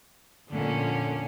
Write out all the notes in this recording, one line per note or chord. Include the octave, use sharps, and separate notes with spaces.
F2 A#2 D3 C#4